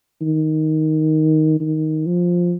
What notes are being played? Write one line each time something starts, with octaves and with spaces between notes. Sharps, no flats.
D#3
D#3
F3